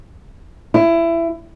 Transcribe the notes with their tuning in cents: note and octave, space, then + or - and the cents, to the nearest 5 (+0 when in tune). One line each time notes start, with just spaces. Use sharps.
E4 +20